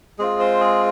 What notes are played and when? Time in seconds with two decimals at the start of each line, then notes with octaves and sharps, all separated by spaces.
0.19 G#3 C4 F4 G#4
0.39 C5
0.61 G#4